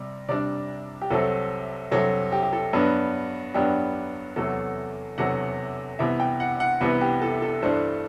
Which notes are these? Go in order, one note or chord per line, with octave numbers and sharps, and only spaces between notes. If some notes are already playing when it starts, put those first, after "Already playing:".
Already playing: C3 G3
C3 G3 D4 D5
G4
C2 C3 F#3 A3 C4 A4
C2 C3 F#3 A3 C4 A4
G4
G4
A4
G2 F#3 B3 D4 B4
G2 F#3 B3 D4 G4
E2 C3 F#3 A3 A4
E2 C3 F#3 A3 F#5
C2 C3 E3 B3 E5
G5
F#5
F#5
C2 C3 E3 B3 B4
G4
A4
A4
G2 E3 A3 D4 C5